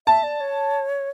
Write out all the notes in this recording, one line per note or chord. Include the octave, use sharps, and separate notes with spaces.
E5 A5
D5
C#5